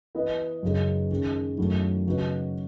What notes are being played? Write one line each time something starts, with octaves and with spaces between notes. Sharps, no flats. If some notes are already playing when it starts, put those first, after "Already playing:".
E3 B3 E4 B4 D#5
F#2 C#3 G#3 D#4 G#4
D#3 G#3 C#4 G#4
F#2 D#3 F#3 A3 E4
C#3 F#3 B3 D#4 F#4